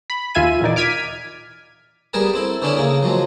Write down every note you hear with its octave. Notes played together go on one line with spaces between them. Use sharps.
B5
D#2 F4 E5 G#5 D#7
E2 A#2 D#4 D5
D6 F6 G#6 B6 D#7
G3 B3 G#4 A#4 G#5 A5
C4 E4 A4
D3 B3 C#4 D4 E4 A4
C#3 A#3 G#4
F3 F#3 G#3